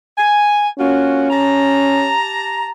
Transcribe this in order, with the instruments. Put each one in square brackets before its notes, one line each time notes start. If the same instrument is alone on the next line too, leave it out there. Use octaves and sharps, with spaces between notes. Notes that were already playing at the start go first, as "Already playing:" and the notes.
[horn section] G#5
[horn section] A#3 F4 F#4 [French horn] C#4
[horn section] G4 A5 A#5